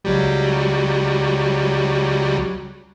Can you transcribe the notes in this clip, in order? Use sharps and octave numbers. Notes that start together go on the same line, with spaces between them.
C#2 F#3 G3